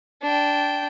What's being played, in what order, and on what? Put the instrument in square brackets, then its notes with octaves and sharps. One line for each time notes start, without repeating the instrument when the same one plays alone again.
[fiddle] D4 G5